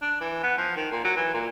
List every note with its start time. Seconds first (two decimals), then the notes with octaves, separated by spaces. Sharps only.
0.02 D4
0.21 E3
0.43 B3
0.58 F3
0.76 D#3
0.91 A#2
1.04 F#3
1.16 E3
1.34 A#2